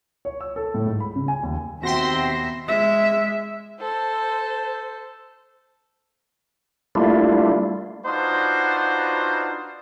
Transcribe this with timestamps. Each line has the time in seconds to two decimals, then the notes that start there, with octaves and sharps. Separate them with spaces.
0.25 C#5
0.41 E6
0.56 A4
0.74 A2
0.87 G#2
1.00 B5
1.16 C#3
1.28 G#5
1.43 D#2
1.83 D#2 B2 C4 F#4 E5 G5 C6 A#6
2.67 G#3 E5
3.80 A4 C5
6.95 G3 A3 A#3 D4 E4 F4
8.06 D4 D#4 F4 F#4 B4 C5